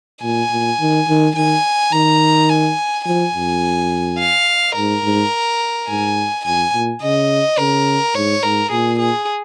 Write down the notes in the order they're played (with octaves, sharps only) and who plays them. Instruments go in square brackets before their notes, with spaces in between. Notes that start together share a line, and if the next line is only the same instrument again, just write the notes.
[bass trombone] A#2 [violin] G#5
[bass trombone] A#2
D#3
D#3
[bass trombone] D#3 [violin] G#5
[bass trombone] D#3 [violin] A#5
[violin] G#5
[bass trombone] F3 [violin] G#5
[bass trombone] F2
[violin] F5
[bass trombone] G#2 [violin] A#4
[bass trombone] G#2
[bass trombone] G#2 [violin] G#5
[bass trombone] F2 [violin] G#5
[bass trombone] A#2
[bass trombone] C#3 [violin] D#5
[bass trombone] C#3 [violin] A#4
[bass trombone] G#2 [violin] C#5
[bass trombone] G#2 [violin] A#4
[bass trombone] A#2 [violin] G#4
[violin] G#4